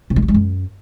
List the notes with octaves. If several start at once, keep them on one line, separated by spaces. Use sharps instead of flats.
C3
G#3
F#3
G#3
F#2